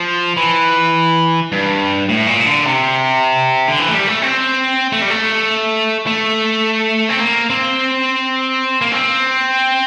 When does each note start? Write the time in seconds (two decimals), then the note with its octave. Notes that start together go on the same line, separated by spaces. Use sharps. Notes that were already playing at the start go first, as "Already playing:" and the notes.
Already playing: F3
0.37 E3
1.52 G2
2.09 A2
2.27 A#2
2.46 D3
2.66 C3
3.68 D3
3.79 E3
3.88 A3
3.94 G3
4.07 A3
4.22 C4
4.92 A3
5.02 G3
5.10 A3
6.07 A3
7.09 C4
7.20 A#3
7.50 C4
8.81 A#3
8.92 C4